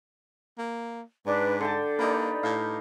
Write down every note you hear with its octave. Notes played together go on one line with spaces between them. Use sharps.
A#3
G#2 D4 B4
D3 D5 G5 A5
A#3 D#4 G4 B4
A2 F5